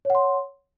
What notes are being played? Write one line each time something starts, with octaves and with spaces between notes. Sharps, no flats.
C#5 F#5 C6